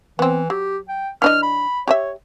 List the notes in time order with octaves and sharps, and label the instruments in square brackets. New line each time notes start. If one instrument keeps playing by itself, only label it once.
[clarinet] E3 [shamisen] B3 C4
[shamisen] F#3 [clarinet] G4
[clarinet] G5
[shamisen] E3 D4 D#5 [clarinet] F6
[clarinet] B5
[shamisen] G4 D#5 E5 [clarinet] C#5